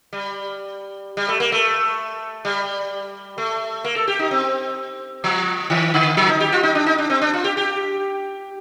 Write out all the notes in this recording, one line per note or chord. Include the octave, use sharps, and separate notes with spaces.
G3
G3
A3
A#3
A3
G3
A3
A#3
A4
G4
D#4
C4
F3
D#3
D3
F3
D#4
G4
F4
D#4
D4
D#4
D4
C4
D4
F4
G4
G4